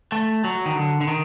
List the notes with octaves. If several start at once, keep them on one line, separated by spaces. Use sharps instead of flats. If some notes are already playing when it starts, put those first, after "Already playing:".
A3
F#3
D#3
D3
D3
D#3